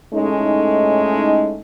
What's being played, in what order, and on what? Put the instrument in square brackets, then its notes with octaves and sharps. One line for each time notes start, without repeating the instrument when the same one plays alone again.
[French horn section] A2 G#3 A3 C#4 D#4